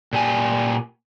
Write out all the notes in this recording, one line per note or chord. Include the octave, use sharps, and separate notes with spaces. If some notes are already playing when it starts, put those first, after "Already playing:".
A#2 G4 G#5